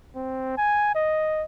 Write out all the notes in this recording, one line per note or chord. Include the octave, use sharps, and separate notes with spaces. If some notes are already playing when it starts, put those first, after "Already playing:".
C4
G#5
D#5